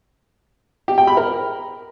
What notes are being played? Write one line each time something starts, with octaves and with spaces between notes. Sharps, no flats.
G4
G5
B5
A#4